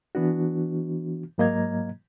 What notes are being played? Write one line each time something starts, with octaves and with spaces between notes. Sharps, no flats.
E3 B3 D4 F#4
G#2 F#3 A#3 D#5 A#5 G#6